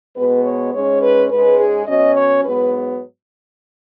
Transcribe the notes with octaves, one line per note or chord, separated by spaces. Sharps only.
B2 G#3 B3 B4
C#5
G#2 G#3 C#4 C#5
B4
G#2 G#3 C#4 B4
G#4
B2 F#3 C#4 D#5
C#5
G#2 F#3 B3 B4